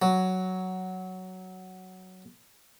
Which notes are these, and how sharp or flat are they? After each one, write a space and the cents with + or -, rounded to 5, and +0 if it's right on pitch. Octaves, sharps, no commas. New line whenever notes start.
F#3 +5